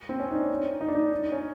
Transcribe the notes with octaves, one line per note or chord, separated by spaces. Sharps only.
C4
C#4
D#4
D4
D#4
D4
D#4
C#4